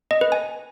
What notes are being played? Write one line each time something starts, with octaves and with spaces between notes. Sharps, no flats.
D#5
B4
G#5